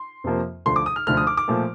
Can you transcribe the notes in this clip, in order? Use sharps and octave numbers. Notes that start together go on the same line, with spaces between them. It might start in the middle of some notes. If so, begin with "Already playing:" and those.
Already playing: C6
F2 C3 F3 A#3
D2 D3 F3 A3 C6
D6
D#6
F6
D2 D3 F3 A3 F6
D#6
D6
D6
A#2 F3 A3